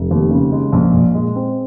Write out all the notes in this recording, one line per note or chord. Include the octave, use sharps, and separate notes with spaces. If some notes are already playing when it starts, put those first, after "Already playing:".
Already playing: F1
D#2
C#3
G#3
A#1
A#2
G#3
C4